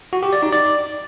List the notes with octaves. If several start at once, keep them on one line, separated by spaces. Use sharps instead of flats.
F#4
G4
D5
D#4
D5